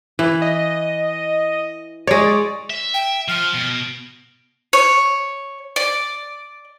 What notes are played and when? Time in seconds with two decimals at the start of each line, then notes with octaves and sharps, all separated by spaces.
0.19 E3
0.42 D#5
2.07 G#3 C#5 D5
2.70 E5
2.94 G5
3.28 F3 F6
3.54 B2
4.73 C#5
5.76 D5